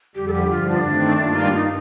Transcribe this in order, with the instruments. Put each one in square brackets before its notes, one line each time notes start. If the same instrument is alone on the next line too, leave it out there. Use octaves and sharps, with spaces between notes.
[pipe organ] F2 D3 G3 [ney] G4
[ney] A4
G4
[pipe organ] G2 D3 F3 [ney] F4
[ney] D4
[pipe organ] D#3 A3 C4
G2 D#3 A#3 F4
[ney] D#4